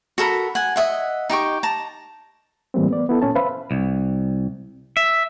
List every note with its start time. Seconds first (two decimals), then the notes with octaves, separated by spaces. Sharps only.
0.18 F#4 A4 A#4 B5
0.55 F#5 G#5
0.76 D#5 E5 F#5
1.30 D#4 G4 G5 C#6
1.63 A5 A#5
2.74 A2 E3 G3 A#3 C4
2.90 B3 D5
3.09 B3 E4 A4
3.22 A#2 C#4 A5
3.35 B4 C5 E5 F5 B5
3.71 C2
4.97 E5